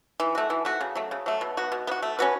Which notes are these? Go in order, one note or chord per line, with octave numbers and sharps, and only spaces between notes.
E3
A3 F#4
E3
A3 F#4
C#3
F#3 A3
C#3
F#3 A3
B2
B3 F#4
B2
B3
F#4
A3
C#4 F#4 B4